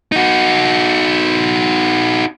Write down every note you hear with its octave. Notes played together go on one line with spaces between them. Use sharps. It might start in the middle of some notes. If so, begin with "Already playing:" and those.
D#4 F#4